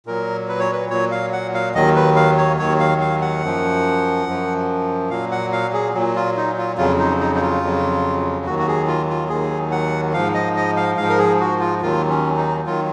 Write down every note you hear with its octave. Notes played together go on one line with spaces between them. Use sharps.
A#2 F#3 A#4
B4
C#5
B4
A#2 F#3 C#5
F5
F#5
F5
D#2 D#3 F#3 D#5
B4
F5
C#5
D#2 D#3 F#3 C#5
F5
F5
F#5
F#2 F3
F#2 F3
A#2 F#3 F5
F#5
F5
G#4
A#2 F#3
F4
D#4
F4
F2 C#3 F#3 F4
D#4
D#4
D#4
F4
F2 C#3 F#3
D#2 D#3 F#3 F#4
F#4
G#4
F4
F4
D#2 D#3 F#3 G#4
F#5
G#2 F3 F5
D#5
D#5
F5
G#2 F3 F5
A#4
G#4
F#4
F4
D#2 D#3 F#3 F4
C#4
D#4
D#3 F#3 F4